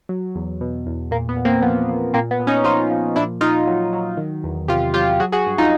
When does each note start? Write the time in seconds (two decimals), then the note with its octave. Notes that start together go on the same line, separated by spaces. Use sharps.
0.09 F#3
0.35 E2
0.61 B2
0.86 E2
1.11 A#2 A#3
1.29 B3
1.37 A#2
1.45 A#3 C4
1.62 F3 B3
1.88 F3
2.14 A#2 A#3 C4
2.31 B3
2.39 A#2
2.47 C#4 D#4
2.64 F3 D#4 F4
2.91 F3
3.16 A#2 D4 E4
3.41 A#2 D#4 F4
3.67 F#3
3.93 F#3
4.17 D#3
4.44 E2
4.68 C3 F4 G4
4.94 F#3 F4 G4
5.20 F#3 F#4 G#4
5.32 F#4 G#4
5.46 G2
5.58 D#4 F4